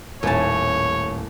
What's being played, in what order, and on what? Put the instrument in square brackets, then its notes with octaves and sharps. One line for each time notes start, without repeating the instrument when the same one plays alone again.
[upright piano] D#1 G#5 [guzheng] A2 A5 [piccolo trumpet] C#5